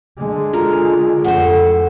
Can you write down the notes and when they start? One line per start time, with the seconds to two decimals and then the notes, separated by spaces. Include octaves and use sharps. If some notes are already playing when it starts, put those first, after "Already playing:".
0.18 D3 G#3
0.53 F4 A#4
1.24 F2 A2 C5 F#5